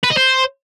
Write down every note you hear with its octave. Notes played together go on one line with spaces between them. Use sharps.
B4
D#5
C5